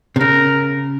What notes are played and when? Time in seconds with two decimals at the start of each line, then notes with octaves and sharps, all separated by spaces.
0.16 C3
0.20 C#3 A#4